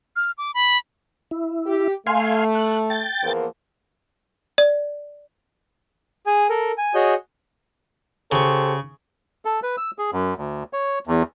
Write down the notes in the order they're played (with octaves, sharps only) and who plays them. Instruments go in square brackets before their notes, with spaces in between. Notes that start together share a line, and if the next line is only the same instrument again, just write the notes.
[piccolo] F6
D6
B5
[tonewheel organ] E4
[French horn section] G4
[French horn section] A3 [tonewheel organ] F5 G#5 C6
[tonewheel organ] F#6
G5 A6
[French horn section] E2 F3 A#3
[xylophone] D5
[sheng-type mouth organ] G#4 G#5
A4 A#4
G#5
F#4 G#4 C#5 D#5 G6
[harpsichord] C#3 C#6 [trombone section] G4 A4 C5
[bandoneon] A4
B4
E6
G#4
F#2
D2
C#5
E2